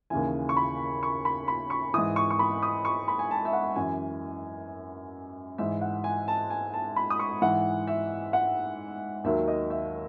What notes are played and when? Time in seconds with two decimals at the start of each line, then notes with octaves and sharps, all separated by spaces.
0.10 D#2 C#3 E3 G#5
0.49 C#6
0.57 B5
1.03 C#6
1.25 B5
1.48 B5
1.70 C#6
1.94 G#2 E3 D#6
2.16 C#6
2.30 C#6
2.39 B5
2.63 D#6
2.85 C#6
3.08 B5
3.19 G#5
3.31 A5
3.45 E5
3.53 F#5
3.76 F#2 E3 G#5
5.58 G#2 E3 E5
5.81 F#5
6.04 G#5
6.28 A5
6.50 G#5
6.74 A5
6.96 B5
7.10 D#6
7.19 C#6
7.42 G#2 E3 F#5
7.87 E5
8.33 F#5
9.24 D#2 D#3 F#3 E5
9.48 D#5
9.70 E5